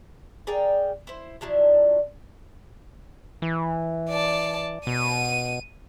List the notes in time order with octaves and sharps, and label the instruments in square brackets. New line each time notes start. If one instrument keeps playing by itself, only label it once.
[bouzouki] G#4 A#4 D5 G5
E4 C5
F3 F#3 D4 E4
[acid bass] E3
[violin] D5 A5
[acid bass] B2 [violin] D#7